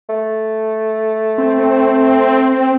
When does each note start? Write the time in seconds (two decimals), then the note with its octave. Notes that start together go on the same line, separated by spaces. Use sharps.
0.09 A3
1.38 C4